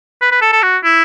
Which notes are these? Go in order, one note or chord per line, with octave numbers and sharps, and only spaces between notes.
B4
B4
A4
A4
F#4
E4